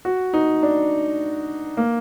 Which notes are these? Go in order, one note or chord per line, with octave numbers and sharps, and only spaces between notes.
F#4
D#4
D4
A#3